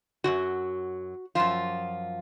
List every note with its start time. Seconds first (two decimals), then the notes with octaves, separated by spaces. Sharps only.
0.24 F#2 D#3 F#3 F#4
1.35 F#2 F3 F4